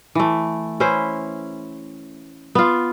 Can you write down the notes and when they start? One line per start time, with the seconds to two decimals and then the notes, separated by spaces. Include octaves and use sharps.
0.15 E3 A3
0.80 C#4 E4 B4 C5
2.55 B3 F4